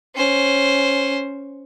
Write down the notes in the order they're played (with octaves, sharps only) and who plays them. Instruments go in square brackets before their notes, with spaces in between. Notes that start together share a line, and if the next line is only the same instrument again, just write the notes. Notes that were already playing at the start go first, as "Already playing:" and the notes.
[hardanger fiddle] C#4 C5